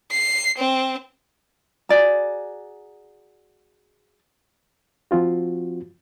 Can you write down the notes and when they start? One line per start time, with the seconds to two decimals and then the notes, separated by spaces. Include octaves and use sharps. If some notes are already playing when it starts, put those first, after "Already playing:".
0.11 C7
0.58 C4
1.89 F#4 G#4 D5 A#5
5.11 F3 C4 F4 F#4